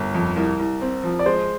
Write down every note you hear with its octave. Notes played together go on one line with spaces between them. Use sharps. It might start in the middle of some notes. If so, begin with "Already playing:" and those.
Already playing: G1 A#4
F2
C2 A#4
C2
C4
F3
D5
G#3 C5